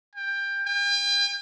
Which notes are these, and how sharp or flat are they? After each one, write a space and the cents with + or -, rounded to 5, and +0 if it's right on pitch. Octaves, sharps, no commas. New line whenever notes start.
G5 +20
G5 +45